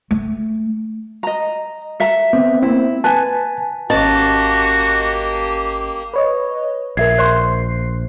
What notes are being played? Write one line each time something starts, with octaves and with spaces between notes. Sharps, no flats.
A3
D#5 A#5
A4 E5 A#5
B3 C4
A#3 C4 E4
B4 G#5 A5
G#1 A#3 C#4 F#4 G4 D#5 A5
B4 C#5 D#5
A#1 A#4 E5 G#6 C7
C5 F#6